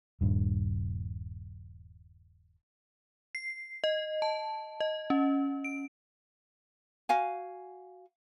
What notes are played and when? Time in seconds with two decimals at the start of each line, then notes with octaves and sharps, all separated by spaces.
0.21 D#1 G2
3.35 C7
3.84 D#5
4.22 A5
4.80 D#5
5.10 C#4
5.64 D7
7.09 F#4 F5 G#5